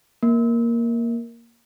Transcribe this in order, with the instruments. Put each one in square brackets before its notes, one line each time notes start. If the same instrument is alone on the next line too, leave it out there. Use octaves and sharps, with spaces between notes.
[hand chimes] A#3